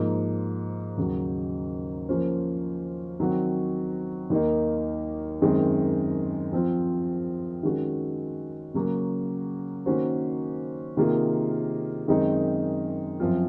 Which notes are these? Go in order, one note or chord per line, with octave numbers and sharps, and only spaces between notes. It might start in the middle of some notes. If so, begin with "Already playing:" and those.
Already playing: G#2 F3 A#3 F4
D#2 C#3 F#3
F3 A#3 C#4 F4 C5
D#3 F#3 C4 F#4
D#2 D#3 A#3 D#4
F#2 D#3 G#3 C4
F3 C4 F4
D#3 G#3 C#4 F#4
C#3 F#3 A#3 C#4 F#4
D#3 A#3 C#4 F#4 C5
C3 D#3 A#3 F4 G#4
F#2 D#3 G#3 C4 D#4
F#2 F3 C4 F4